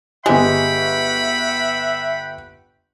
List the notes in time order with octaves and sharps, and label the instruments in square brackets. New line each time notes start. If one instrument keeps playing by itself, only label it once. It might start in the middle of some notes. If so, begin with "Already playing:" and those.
[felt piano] G1 G4 [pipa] G#3 [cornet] E5 [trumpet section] F#5 G5 B5